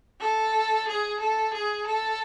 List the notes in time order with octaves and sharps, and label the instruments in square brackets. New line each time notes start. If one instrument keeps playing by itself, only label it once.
[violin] A4
G#4
A4
G#4
A4